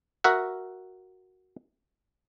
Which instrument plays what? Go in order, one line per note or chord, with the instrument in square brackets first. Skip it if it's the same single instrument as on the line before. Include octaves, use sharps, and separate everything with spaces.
[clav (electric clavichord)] F#4 A#4 E5 F#5